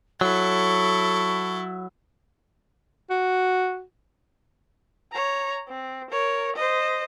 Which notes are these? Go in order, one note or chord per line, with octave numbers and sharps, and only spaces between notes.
F#3 E4 A4 C#6
F#4
C#5 A#5
C4
A#4 C#5
C5 D#5